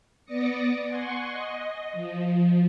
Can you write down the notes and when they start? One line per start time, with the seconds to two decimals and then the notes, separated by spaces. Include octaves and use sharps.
0.25 B3 D5 D6 D#6 A#6 C#7
0.86 F#5 G#5 C6 C#6
1.29 D#5
1.93 F3